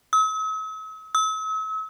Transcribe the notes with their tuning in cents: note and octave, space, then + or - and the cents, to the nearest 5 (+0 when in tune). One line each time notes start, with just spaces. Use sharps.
E6 -45
E6 -40